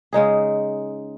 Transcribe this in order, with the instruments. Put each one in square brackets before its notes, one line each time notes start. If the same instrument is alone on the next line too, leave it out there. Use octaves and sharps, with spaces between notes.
[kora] C#3 G#3 D#4 G#4